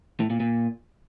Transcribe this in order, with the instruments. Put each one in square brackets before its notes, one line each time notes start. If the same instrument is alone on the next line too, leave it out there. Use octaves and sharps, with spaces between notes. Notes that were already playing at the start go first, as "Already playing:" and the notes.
[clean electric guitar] A2
A#2
A#2